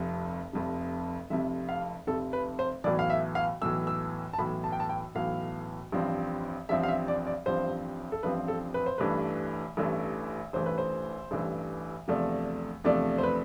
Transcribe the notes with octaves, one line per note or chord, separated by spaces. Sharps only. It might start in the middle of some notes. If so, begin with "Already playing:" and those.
Already playing: F1 F2 C3
F1 F2 C3
F1 F2 C3 E5
F5
F1 F2 C3 A4
B4
C5
B1 A2 E3 D5
F5
E5
F5
B1 A2 E3 E6
E6
A5
B1 A2 E3 B5
A5
G5
A5
G5
B1 A2 E3 F5
A1 G2 F3 C4
A1 G2 F3 C4 E5
F5
E5
D5
D5
A1 G2 F3 C4 C5
A4
A1 G2 F3 C4 B4
A4
B4
C5
A1 G2 E3 A3 B4
A1 G2 E3 A3
A1 G2 E3 A3 C5
B4
C5
A1 G2 E3 A3
E2 C3 F3 A3 D4
E2 C3 F3 A3 D4 D5
C5
B4